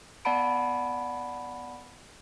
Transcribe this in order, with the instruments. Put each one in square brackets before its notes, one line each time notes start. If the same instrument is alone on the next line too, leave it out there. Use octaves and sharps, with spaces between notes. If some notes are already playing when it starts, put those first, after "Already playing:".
[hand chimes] B3 D5 F#5 A5 B5 D7